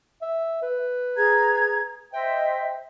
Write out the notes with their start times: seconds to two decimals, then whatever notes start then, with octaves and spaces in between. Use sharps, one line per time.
0.21 E5
0.62 B4
1.16 G#4 A#5 G#6
2.13 C5 D#5 E5 G5